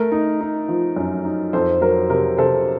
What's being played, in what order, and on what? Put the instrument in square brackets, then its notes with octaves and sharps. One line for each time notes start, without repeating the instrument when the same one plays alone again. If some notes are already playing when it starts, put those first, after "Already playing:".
Already playing: [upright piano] A3 A#4
D#4
D#4
F3
F#2
D#4
F2 A4 C5
F#3 A#4
C3 A#4
C3 A4 C5